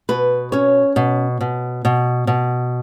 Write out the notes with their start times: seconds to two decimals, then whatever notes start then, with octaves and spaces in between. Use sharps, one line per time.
0.09 B2 B4
0.52 C#4 C#5
0.96 B2
1.41 B2
1.85 B2
2.27 B2